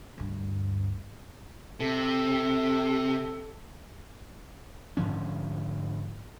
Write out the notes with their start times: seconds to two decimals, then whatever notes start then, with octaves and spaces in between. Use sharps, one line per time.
0.18 D2 G2
1.80 C3 A4
4.97 G#2 D3 F3 C#4